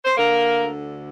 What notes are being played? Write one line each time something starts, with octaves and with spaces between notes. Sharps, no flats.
C5
D3 A#3 A#4
D2